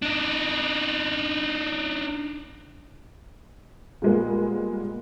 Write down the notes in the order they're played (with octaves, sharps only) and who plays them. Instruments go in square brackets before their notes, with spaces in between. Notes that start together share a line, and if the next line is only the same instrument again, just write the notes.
[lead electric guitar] D4 D#4
[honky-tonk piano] A#2 G3 G#3 A#3 B3